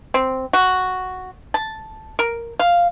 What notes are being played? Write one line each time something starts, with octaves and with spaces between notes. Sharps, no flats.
C4
F#4
A5
A#4
F5